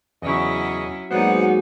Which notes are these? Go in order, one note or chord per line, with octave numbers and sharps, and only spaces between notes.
E2 C#3 F#3 C#4 E4 D#5
G#2 F#3 A#3 B3 D#4 C5 D5 F#5